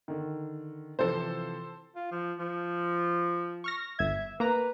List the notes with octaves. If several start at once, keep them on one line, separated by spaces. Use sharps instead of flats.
D3 D#3
C3 E3 F3 A4 C5
F4
F3
F3
C#6 F6 A#6
G1 E5 G#6
A#3 B4 A#5